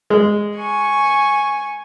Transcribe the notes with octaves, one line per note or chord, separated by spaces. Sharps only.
G#3
G#5 C#6